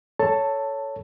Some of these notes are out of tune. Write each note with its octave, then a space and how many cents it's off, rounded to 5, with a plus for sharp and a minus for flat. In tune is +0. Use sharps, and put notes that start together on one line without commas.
A4 +0 C#5 +10 A5 +15